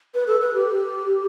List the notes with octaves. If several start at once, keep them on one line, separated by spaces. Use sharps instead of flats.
B4
A4
B4
G4